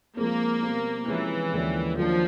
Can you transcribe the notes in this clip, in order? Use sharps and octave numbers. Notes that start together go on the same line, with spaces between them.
F3 G#3 A#3 C4
B2 G3 C4
C3 E3 F3 G#3 C#4
D#2 D3 F3 G#3 C#4
D#3 F3 F#3 A#3 D4